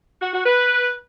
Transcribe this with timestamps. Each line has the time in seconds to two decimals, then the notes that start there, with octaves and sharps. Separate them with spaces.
0.22 F#4
0.33 F#4
0.45 B4